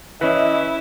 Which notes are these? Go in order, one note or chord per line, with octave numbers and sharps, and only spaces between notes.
E3 C#4 E4 B4 D#5